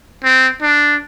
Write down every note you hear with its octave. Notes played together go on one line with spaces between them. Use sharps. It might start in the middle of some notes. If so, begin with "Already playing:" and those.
C4
D4